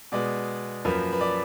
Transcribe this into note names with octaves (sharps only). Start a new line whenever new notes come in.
B2 G#3 B3 D5
F#2 F3 A#3 B4
B4
D5